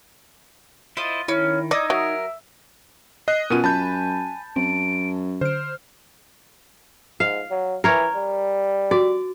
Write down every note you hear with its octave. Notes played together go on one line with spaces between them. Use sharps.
E4 F4 C5 D#5
D#3 C#4 E4
D#4 D5 D#6 E6 G#6
F#3 A#4 E5 E6
D#5 F#6 C7
B2 B3 C#4 F4 A#4 G#5 D#7
F#2 A5 B5 G6
F#2 C4 D7
D3 C5 F6 D7
G#2 F5
F#3
E3 A#4 C#5
G3
F#4 D5